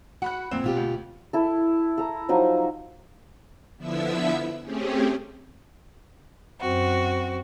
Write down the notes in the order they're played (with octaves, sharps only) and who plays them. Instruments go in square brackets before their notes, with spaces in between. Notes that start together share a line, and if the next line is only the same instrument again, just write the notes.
[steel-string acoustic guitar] F#4 [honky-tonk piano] F#5 B5 F#6
[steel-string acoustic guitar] F2 [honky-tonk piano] A#2 C4
[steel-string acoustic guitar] B2 F4 G4
[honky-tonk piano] D2
[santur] E4 A4
A4 A#5
F3 F#3 D#4 G#5
[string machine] D3 F3 B3 E4 E5 E6
A3 C4 C#4 G4 G#4
[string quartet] F#2 C4 F#4